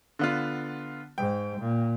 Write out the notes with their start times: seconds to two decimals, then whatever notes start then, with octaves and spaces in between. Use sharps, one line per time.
0.19 D3 B3 F4
1.18 G#2 G5
1.60 A#2